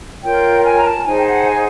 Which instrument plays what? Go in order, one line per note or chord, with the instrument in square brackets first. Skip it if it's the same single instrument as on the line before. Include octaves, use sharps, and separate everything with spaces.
[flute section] F4 A#4 C#5 G5
G#5
A#5
A5
D#4 G#4 C5 G#5
G5
F#5
G#5